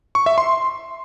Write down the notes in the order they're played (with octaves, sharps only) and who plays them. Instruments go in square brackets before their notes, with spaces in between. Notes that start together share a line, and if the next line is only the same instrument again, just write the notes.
[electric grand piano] C#6
E5
C6